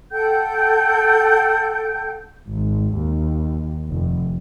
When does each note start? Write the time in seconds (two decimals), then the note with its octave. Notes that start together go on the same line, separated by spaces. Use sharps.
0.12 A4 F#5 G5 G6
2.49 G#1
2.95 D#2
3.89 F1